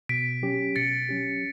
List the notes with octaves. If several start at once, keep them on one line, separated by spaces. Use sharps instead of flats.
B2 B6 D7
F#3 C#4 G4
B2 A6 C#7
F#3 C#4 G4